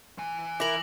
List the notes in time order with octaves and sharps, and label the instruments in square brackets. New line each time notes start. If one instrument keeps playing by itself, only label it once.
[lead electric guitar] E3 G#5
[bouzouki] E4 A#4 [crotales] D6 A#6 F#7